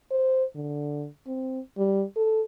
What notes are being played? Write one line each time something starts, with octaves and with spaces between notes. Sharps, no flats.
C5
D3
C4
G3
A4